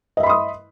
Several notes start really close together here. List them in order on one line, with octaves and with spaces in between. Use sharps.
D#5 E5 B5 C6 D#6